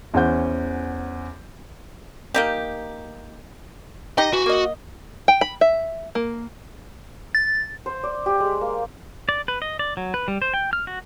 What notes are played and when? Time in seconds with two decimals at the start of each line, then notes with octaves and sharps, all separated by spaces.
0.14 E2 C#4 C5 C#5 F#5 G6
2.34 A#3 D#4 G4
4.18 D#4 G4 D#5
4.33 E3 F#4
4.46 A#3 D#5
5.28 G5
5.41 B5
5.61 E5
6.15 A#3
7.35 A6
7.86 C5
8.03 D5
8.26 G4
8.40 G#3
8.61 A#3
9.29 D5
9.48 B4
9.62 D#5
9.79 D5
9.97 F#3
10.14 B4
10.28 G3
10.42 C5
10.54 G5
10.73 F6
10.87 F#4